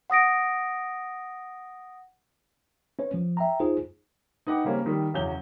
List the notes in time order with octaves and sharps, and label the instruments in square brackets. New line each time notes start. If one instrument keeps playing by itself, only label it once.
[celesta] F#5 D#6 A#6 D7
[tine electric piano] C#4 B4 C#5
F3
E5 G5 A#5
D#4 F4 G#4 C5
[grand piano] D#4 B4 F#5 G5 D6
C#3 G3 A#3 C4 C#4
D#3 G3
E2 C#3 F#3 C#4 G6 G7